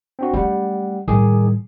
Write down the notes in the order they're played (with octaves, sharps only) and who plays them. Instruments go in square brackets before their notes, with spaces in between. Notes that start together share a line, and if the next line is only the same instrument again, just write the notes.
[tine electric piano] C4 D4 F#4
[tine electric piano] G3 F#5 [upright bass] A3 C#4
[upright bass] A2 G3 [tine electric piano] D#3 G#4 D6